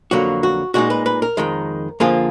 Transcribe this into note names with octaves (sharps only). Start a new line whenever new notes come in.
F2 D3 F#3 A#3 F#4
F#4
A#2 G#3 D#4 F#4
B4
B4
A#4
F2 D#3 G#3
F2 D3 F3 A#3 F4 G#4